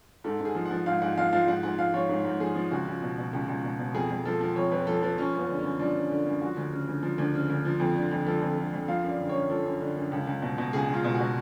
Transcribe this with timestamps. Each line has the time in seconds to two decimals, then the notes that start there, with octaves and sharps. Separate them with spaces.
0.24 G#2 A4
0.40 G#2
0.45 G#4
0.55 F3
0.65 F#5
0.71 F3
0.86 G#2 F5
1.02 G#2 F#5
1.18 F3 F5
1.33 F3 F5
1.47 G#2 F#5
1.63 G#2 F#5
1.79 F3 F5
1.94 F3 C#5
2.09 G#2
2.25 G#2
2.40 F3 G#4
2.56 F3
2.71 C#2 F#4
2.87 C#2
3.02 B2
3.18 B2
3.33 C#2
3.48 C#2
3.64 B2
3.79 B2
3.95 F2 G#4
4.10 F2
4.25 F3 A4
4.41 F3
4.56 F2 C#5
4.72 F2 B4
4.87 F3 A4
5.02 F3 B4
5.18 F3 C#4
5.33 F#2
5.39 B3
5.49 D3
5.59 C#4
5.64 F#2
5.79 F3 D4
5.95 F#2
6.10 D3
6.26 F#2
6.42 F3 F#4
6.57 D2
6.73 C#3
6.88 D2
7.03 F3
7.18 D2
7.34 C#3
7.50 D2
7.65 F3
7.80 F2
7.96 D3
8.11 F2
8.26 F3 A4
8.42 F2
8.57 D3
8.73 F2
8.88 F3 F5
9.04 F#2 D5
9.19 D3
9.29 C#5
9.34 F#2
9.50 F3 A4
9.65 F#2
9.80 D3
9.96 F#2
10.12 C#2
10.27 C#2
10.42 B2
10.58 B2
10.73 C#2 G#4
10.89 C#2
10.94 F4
11.04 B2
11.15 F#4
11.20 B2